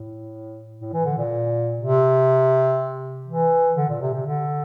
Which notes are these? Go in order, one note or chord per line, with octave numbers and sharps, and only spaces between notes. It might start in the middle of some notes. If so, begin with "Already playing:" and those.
Already playing: A2
A2
E3
D3
A#2
C3
E3
D3
A#2
C3
C3
D3